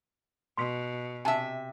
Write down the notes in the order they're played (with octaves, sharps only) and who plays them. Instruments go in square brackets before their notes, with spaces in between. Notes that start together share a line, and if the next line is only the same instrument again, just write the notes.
[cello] B2 [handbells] C6 B6
[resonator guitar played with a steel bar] C3 E5 [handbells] G#5 A5